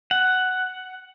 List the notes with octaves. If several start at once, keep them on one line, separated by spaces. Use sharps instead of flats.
F#5